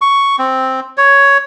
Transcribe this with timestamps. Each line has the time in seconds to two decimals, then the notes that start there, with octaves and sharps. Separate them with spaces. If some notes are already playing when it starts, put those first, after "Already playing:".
0.01 C#6
0.39 C4
0.97 C#5